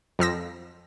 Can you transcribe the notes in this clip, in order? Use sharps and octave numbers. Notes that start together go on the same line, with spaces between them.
F2 F3 E6 A#6